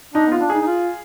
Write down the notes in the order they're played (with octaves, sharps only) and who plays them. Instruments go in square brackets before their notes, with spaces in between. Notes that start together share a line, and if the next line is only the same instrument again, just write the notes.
[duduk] D4 [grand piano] D#4
[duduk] B3 [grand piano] F4
[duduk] D4
[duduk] D#4 [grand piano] G#4
[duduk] D#4
F4